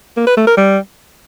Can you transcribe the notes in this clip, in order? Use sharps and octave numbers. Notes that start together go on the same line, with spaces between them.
A#3
B4
A3
A#4
G3